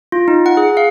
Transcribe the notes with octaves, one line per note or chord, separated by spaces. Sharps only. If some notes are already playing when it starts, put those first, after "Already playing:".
F4
D#4
F#5
G#4
F5